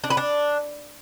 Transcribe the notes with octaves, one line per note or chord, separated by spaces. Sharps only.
D4
B4
D4